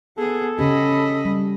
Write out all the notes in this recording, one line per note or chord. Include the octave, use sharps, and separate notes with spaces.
B3 G#4 A4
C#3 C#4 G4 D#5 B5
G3